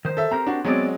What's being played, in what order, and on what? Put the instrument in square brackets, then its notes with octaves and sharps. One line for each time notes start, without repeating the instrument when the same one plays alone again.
[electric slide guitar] D#3 C5
[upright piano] A4 E5
[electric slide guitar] C4 G4 A#4 [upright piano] A#5
[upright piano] D4 F#4
[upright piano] F#3 G#3 C4 [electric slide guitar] B3 D5